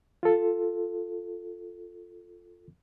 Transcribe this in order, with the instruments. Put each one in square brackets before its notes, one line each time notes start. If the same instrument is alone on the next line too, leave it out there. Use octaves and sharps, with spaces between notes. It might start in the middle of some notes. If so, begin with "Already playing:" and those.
[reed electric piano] F4 A4